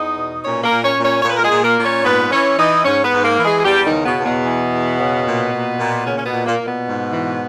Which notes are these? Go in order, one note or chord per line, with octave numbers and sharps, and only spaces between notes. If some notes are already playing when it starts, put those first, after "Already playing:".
Already playing: E2 D#4 D#5
B2
A#2 C#4 C#5
A#3 A#4
A#2
C#4 C#5
A#2
C#4 C#5
A#2 C#5
B4
A#4
G#3 G#4
A#2
A#3 A#4
A#2
C#4 C#5
G#2 B3 B4
E3 C#4 C#5
E3 D#4 D#5
G#2 C#4 C#5
B3 B4
G#2
A#3 A#4
E3
G#3 G#4
G#4
E2 G3 G4
D#3 D#4
C#3
B2 B3
E2
B2 B3
E3
E2
C#3
A#2
A#2
A#2
A#2 C#3 C#4
C#4
B2 B3
A#2
A#2 A#3
A#2
B2 B3
G#2
E3